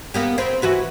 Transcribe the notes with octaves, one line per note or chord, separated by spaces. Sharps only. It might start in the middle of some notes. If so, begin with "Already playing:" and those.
A#3 B3 G4
C4 B4
E3 F#4 B4